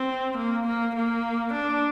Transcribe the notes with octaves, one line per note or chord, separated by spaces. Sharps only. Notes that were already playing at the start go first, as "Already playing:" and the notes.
Already playing: C4
A#3
A#3
A#3
D4